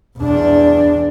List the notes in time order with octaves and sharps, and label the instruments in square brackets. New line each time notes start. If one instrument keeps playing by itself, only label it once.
[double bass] E2 D4